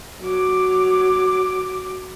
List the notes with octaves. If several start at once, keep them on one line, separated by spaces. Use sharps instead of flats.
F#3 D6